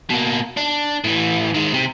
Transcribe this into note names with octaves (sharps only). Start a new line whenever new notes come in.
B2 A#3
D4
A2 E3
D#3 G#3
C3